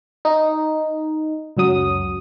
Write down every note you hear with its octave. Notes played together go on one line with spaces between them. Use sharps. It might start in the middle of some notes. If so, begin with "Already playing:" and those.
D#4
C#2 F#2 F#3 D#6